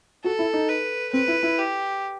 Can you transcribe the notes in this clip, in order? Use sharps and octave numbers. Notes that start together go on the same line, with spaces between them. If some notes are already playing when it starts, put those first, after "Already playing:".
F#4 A4
E4
D#4
B4
C4 B4
E4
E4
G4